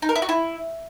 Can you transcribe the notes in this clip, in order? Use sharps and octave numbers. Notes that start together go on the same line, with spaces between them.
D#4
A#4
E4
F#4
E4